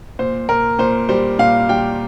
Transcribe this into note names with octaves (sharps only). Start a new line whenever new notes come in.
A#2 C5
A#2 A#4
A#2 C5
G3 C5
A#2 F5
G3 G5